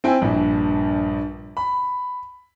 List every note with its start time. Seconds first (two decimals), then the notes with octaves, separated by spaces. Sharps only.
0.04 C4 E4 G5 G#5
0.22 A#1 G2
1.57 B5